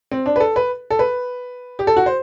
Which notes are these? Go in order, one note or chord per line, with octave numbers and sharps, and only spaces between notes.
C4
D4
B4
A4
B4
A4
B4
G4
A4
F#4
C5